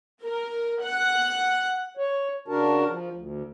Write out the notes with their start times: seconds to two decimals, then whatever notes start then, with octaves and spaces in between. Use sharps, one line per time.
0.24 A#4
0.82 F#5
1.97 C#5
2.48 C#3 D4 F#4 A#4 A5
2.88 F3
3.13 D2